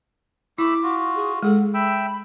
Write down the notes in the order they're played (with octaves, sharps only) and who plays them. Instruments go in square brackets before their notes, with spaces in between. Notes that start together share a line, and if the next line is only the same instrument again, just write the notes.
[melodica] A3 B5 E6 [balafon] E4 [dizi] D6
[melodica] F4 F#4
[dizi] G#4
[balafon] G#3 G#4 A4 [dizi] F#5
[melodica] E5 G5 E6 [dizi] B5